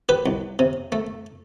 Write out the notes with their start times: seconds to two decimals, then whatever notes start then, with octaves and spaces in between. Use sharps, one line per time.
0.09 G4 B4
0.26 C2
0.59 C3
0.92 A3